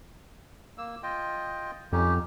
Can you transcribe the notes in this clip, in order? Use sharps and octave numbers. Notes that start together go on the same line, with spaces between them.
A#3 E6
F4 D#5 G5
F2 C#4 D#4 G4